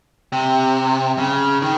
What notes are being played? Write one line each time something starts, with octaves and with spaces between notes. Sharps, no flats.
C3
C#3
D#3